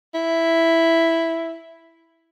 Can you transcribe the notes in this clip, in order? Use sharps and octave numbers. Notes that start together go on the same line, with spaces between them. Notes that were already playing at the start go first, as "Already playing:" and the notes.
E4